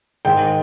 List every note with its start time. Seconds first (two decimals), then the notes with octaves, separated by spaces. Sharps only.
0.25 G#2 D#3 G#3 G5